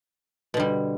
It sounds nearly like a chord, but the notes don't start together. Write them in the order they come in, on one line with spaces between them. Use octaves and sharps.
B2 D3 G3